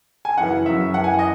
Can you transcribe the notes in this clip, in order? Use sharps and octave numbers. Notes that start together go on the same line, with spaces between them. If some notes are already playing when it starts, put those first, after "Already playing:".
G#5
F#2 C#3 E3 F#5
F#2 C#3 F#3 E5
F#2 E3 F#5
G#5
F#5
D#5